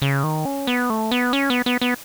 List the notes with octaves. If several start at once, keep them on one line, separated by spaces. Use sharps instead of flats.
C#3
D#3
C#4
B3
A3
B3
C#4
B3
B3
B3